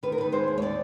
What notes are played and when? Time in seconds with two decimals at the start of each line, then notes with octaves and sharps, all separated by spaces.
0.03 D#3 B4
0.12 A#4
0.18 D#3 B4
0.32 G#3 C5
0.48 D#2
0.58 C#5
0.62 D#3 D5